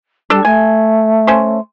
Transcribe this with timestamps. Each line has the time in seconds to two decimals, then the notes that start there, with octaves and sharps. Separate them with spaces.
0.30 G3 D4 A4
0.45 A3 G#5
1.27 C#4 C5